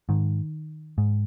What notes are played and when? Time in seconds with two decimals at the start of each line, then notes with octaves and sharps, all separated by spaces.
0.09 G#2 D#3
0.98 G#2